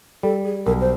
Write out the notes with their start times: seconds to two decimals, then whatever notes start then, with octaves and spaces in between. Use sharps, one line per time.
0.23 G3 A4
0.44 G#4
0.66 B1 A#4
0.81 C5